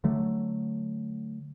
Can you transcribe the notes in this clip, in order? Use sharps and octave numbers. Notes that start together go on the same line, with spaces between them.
D3 F#3 A3